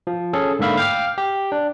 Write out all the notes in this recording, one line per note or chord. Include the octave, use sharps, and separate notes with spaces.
F3
C#4 G#4 A4
G#2 D3 A#3 E5 F5 B5
F5 G5 D6 F6
G4
D4